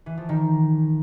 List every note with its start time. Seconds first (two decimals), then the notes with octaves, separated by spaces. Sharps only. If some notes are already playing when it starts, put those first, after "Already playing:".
0.06 E3
0.18 F3
0.29 D#3